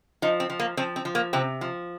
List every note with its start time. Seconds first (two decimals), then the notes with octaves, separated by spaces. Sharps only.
0.22 F3 D#4
0.40 C4
0.50 F3
0.60 A#3
0.77 F3 C4
0.96 C4
1.05 F3
1.15 A#3
1.33 C3 C4
1.61 F3